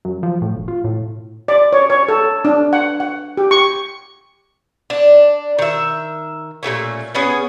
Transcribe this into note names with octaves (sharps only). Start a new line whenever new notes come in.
F#2
F3
A2
E1
F4
A2
D5
C#5
C#5
A4
D4
F#5
F#5
G4
C#6
D4
D#3 E5
A#2 C#3 A3 C#4
B3 C#4 G#4